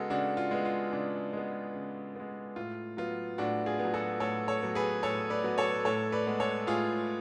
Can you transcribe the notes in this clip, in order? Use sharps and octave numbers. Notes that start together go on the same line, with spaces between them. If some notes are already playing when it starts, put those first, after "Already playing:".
Already playing: C#3 G#3 B3 F#4 A4
C#3 D4 F#4
F4
G#3 B3
F4
C#3 D4
G#3 B3
C#3
G#3 B3
A2 F4
F#3 B3 F4
A2 D4 F#4
F4 G#4
B3
F#3
F#4 A4
A2 A4 C#5
A4 C#5
F#3 B3
G#4 B4
A2 A4 C#5
B4 D5
F#3 B3
A4 C#5
A2 A4 C#5
B4 D5
G#3 B3
A4 C#5
A2 F4 G#4